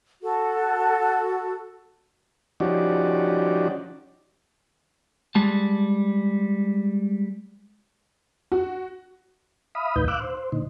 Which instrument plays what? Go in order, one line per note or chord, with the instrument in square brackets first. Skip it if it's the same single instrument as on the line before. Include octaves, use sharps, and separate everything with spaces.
[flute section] F#4 A4
[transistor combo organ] F3 C#4 D#4 F#4 G4 D5
[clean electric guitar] G3 G#3 A5
[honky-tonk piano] F#4
[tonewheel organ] E5 F5 B5 D#6
D#2 A2 D#4 B4 G6
F5 D6 E6 F#6
C5
C5
A#2 D3 D#4